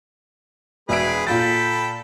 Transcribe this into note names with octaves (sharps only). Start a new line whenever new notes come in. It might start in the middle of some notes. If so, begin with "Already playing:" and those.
E1 G#3 G#4 B4 E5 D7
A#2 F4 A4 G5 B5 A6